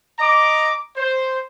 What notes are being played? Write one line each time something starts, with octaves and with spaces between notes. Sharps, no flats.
D#5 A#5 D6
C5